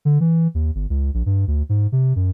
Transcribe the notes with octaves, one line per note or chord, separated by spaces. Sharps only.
D3
E3
D#2
G1
C#2
A#1
G2
D2
G#2
C3
F#2